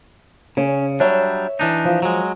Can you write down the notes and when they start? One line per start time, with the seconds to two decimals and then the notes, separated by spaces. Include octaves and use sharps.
0.57 C#3 C#4
1.00 F#3 G3 D4 C#5 E5
1.59 E3 D4 D#4
1.85 F3
2.02 F#3 G#3